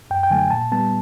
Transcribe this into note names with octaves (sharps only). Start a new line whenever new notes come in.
F#2 G5
G5
D3 F#3 A3 G#5
A#2 A5
G3 B3 A5